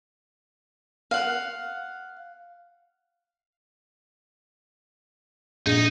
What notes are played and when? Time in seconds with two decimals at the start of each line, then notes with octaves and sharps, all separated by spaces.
1.11 F5 F#5
5.66 A#1 D#4 G#4